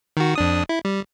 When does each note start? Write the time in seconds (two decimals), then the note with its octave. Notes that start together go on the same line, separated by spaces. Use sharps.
0.17 D#3 F#4
0.35 F2 D4 D#6
0.69 E4
0.85 G3